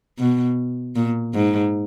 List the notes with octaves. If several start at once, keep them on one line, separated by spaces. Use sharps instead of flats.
B2
A#2
G#2